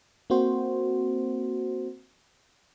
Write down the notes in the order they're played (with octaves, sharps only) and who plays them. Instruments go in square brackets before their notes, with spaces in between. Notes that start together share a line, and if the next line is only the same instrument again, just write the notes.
[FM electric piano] A#3 C4 F#4 C5